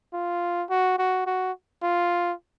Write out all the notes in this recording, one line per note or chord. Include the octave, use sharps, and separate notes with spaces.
F4
F#4
F#4
F#4
F4